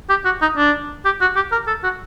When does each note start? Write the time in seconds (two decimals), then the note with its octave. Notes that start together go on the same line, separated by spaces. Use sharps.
0.10 G4
0.25 F#4
0.42 D#4
0.57 D4
1.05 G4
1.21 F#4
1.36 G4
1.52 A#4
1.67 A4
1.84 F#4